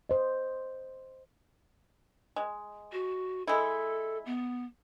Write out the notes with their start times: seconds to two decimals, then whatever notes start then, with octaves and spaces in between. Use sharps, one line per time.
0.09 C5 D#5
2.36 G#3
2.92 F#4
3.47 G#3 E4 A4
4.26 B3